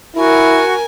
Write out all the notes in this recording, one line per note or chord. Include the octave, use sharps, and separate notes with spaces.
E4 F#4 A#4 G#5